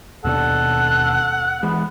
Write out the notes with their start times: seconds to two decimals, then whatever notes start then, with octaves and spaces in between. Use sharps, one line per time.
0.25 D#2 B2 D4 A4 F#5
1.63 E3 G#3 B3